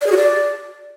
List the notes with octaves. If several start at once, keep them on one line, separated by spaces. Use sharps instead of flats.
D5
G#4
F#4
D5